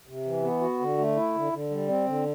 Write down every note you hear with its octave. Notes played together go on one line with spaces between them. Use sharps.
C3
E3
B3
F#4
D3
A3
E4
D3
D3
G3
C4
D3